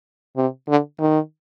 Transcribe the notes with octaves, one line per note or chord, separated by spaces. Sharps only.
C3
D3
D#3